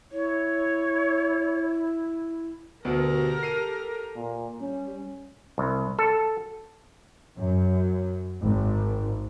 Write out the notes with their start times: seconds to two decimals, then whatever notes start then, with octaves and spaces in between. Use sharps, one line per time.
0.12 E4 C#5
2.85 D2 B2 G4 A4 A#4
3.43 C7 D#7
4.16 A#2
4.61 G3 C#4
5.58 C2
5.99 A4
7.37 F#2
8.42 G#1